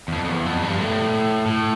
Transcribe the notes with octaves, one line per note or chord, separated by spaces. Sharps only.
E2
F2
F2
E2
F2
G2
A2
A2